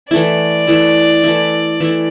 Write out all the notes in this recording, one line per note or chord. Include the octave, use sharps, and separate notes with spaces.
E3 A3 E4 D5
E3 A3 E4
E3 A3 E4
E3 A3 E4